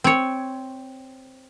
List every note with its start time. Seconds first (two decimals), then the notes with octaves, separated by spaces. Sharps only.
0.04 C4 C#5